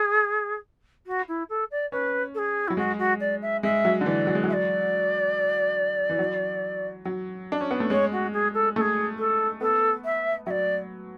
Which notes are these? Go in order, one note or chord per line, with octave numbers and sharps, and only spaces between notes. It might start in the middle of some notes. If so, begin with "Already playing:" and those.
Already playing: G#4
F#4
E4
A4
D5
C#4 B4
A4
G#4
F#3 E4
G#3 F#4
F#4
D5
E5
G#3 E5
F#3
D3
E3 D5
F#3
G#3
F#3 E5
D5
E3
F#3
F#3
D4
C#4
B3
A3
G#3 C#5
F#4
G#4
A4
A3 G#4 A4
A4
B3 A4
E5
F#3 D5 E5